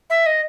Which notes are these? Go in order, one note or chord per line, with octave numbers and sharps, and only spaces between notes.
E5
D#5